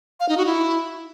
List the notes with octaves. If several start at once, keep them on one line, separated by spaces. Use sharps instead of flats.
F5
D#4
F#4
E4